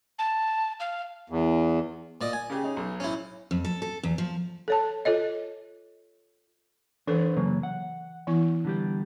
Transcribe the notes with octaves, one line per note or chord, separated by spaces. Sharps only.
A5
F5
E2
A#2 D5 D#5
G#5
C#3 G4 G#4
C#4 D#4 G#4
B1
C#4 E4
F2
A4
A4
E2
F3
A4 C#5 A5
F4 A4 C#5 D#5
E3 D4 A4 B4 C5
C#3 F#3 A#3
F#5
E3 B3 E4
D3 G3 G4